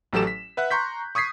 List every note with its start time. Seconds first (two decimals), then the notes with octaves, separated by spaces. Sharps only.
0.13 A1 F#3 G4 A4 E7
0.27 B6
0.57 B4 E5 F#5 F#6
0.71 A#5 C6 C#6 G6 B6
1.15 C#6 D#6 G#6 B6 C7